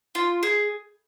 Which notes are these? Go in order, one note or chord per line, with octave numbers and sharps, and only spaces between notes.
F4
G#4